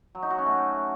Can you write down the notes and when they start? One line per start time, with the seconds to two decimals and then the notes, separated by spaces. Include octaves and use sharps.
0.15 F#3
0.23 D#4
0.30 F#4
0.38 C#4
0.46 A3